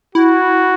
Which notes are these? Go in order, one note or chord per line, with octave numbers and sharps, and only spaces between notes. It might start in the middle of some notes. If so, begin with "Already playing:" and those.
E4 F#4